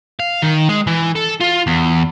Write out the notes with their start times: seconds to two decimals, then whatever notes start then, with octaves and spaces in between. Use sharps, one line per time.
0.20 F5
0.42 D#3
0.69 G#3
0.87 E3
1.16 A4
1.41 F4
1.67 E2